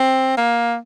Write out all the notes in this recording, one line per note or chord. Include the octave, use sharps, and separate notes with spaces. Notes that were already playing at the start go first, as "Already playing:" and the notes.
Already playing: C4
A#3